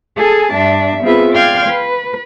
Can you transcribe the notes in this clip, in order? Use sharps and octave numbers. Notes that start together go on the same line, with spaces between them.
G#4 A4 G#5 A5
G2 D4 E5
B3 C4 F4 G#4 B4 E5
D5 F5 G5 C6 F6 G#6
B4